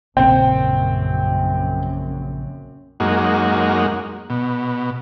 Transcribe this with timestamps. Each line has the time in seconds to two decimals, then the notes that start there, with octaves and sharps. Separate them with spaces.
0.17 A#1 F#2 A#2 C#3 C4 G5
3.00 F#2 G#3 A#3 D#4 F#4
4.30 B2